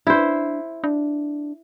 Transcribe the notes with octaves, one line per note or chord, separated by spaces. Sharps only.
D4 E4 C5
D4